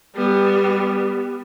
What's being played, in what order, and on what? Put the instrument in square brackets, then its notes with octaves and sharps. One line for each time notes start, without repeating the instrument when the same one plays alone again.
[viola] G3 B3